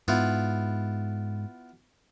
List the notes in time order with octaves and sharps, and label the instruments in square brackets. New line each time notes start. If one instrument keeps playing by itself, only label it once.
[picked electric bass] G#2 [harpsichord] B3 E4 F4